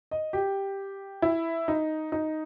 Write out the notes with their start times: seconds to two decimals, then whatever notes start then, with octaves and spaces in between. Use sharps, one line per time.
0.11 D#5
0.33 G4
1.22 E4
1.68 D#4
2.12 D#4